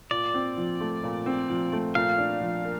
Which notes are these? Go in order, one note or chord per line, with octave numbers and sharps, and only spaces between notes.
A#2 D5
C4
F3
A3
A#2
C4
F3
A3
A#2 F5
D4
F3
A#3